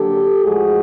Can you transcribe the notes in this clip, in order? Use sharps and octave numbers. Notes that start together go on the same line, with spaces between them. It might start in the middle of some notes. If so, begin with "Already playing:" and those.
Already playing: D3 F#3 A#3 D4 G4 A4
A2 F3 G#3 F#4 G#4